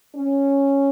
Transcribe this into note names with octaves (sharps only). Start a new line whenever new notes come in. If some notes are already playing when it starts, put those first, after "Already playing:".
C#4